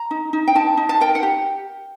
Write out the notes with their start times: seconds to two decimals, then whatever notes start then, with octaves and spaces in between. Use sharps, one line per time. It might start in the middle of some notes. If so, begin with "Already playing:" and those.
Already playing: A#5
0.11 D#4
0.33 D#4
0.47 G5
0.55 D#4 A5
0.77 D#4
0.89 A5
1.01 A#4 G5
1.15 F#5
1.23 G4